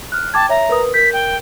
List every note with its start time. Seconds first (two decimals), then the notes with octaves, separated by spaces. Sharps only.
0.12 F6 F#6
0.34 G5 A5 D6 G#6
0.49 C#5 E5 A#5
0.69 A#4 B4 D#6
0.94 A#4 G6 B6
1.13 G5